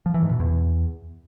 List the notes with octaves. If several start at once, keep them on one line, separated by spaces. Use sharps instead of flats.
F3
E3
G#2
B2
E2